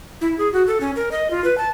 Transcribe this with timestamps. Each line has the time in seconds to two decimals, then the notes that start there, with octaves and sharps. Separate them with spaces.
0.21 E4
0.38 G#4
0.53 F#4
0.67 A4
0.81 C#4
0.96 A#4
1.12 D#5
1.31 F4
1.44 B4
1.58 A5